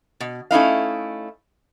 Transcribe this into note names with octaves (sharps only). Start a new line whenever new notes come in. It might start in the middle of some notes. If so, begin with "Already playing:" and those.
B2
A3 C#4 D#4 E4 F5